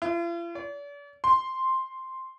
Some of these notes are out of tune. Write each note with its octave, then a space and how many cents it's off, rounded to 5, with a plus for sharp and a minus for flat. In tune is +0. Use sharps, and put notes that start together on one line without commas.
F4 -45
D5 -40
C6 +0